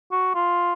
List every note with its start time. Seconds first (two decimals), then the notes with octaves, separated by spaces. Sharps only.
0.11 F#4
0.35 F4